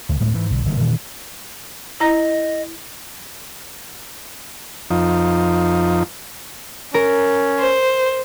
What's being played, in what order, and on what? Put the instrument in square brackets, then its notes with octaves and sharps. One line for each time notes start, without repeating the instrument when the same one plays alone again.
[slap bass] D2
D1 A2 G#3
G#2 E3
B1 D3
F#1 C3 D#3
G2 A#2 D#3 E3
[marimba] E4 A#5 A#6 [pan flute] D#5
[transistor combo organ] F2 F3 D#4
[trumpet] C#4 [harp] A#4
[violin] C5